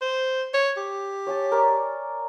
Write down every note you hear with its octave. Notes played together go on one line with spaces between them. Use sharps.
C5
C#5
G4
C#5 G#5 A5
A#4 D5 C#6